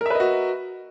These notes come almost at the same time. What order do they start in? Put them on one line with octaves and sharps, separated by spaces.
A#4 E5 B4 D#5 F#4